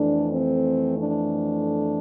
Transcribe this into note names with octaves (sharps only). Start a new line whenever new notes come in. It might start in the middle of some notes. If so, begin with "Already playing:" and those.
Already playing: F2 E3 A3 D4
C4
D4